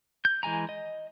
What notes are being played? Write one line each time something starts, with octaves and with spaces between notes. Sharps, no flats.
G6
E3 G#3 G#5 A#5
D#5